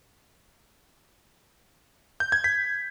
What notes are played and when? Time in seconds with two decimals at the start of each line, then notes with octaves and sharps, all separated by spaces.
2.20 G6
2.32 G#6
2.44 B6